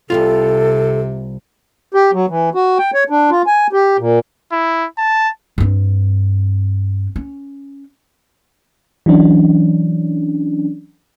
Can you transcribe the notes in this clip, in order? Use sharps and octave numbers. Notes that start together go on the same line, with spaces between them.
C2 F2 C3 F4 A4
G4
F#3
E3
F#4
G5
C#5
D4
F4
G#5
G4
A#2
E4
A5
G2 C4
C#4
E3 F#3 C#4 D4